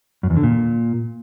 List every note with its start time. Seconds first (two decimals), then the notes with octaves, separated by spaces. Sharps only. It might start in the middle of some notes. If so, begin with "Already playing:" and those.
0.23 F#2
0.30 E2
0.37 D3
0.43 A#2